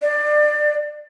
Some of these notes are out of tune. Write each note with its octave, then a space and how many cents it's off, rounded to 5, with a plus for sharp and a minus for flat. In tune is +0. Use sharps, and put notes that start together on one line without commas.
D5 +25